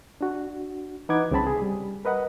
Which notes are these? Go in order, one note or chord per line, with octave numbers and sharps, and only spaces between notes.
D4 F#4
E3 D#4 B4 F#5 D6 G#6
C2 C#3 C4 A5 B5
G#4
G3
A#4 B4 D#5 F#5